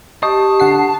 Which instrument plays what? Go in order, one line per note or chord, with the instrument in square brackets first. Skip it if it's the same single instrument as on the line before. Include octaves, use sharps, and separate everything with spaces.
[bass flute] G4 [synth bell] D#5 C#6 D#6 [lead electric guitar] A5
[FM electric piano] D3 F#5 C7